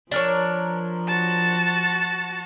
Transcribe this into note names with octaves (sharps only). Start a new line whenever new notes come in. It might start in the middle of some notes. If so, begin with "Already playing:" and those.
F3 D4 A#4 C#5
F#4 A5